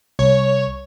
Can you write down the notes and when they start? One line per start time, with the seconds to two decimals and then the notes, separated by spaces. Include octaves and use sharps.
0.19 C2 C#5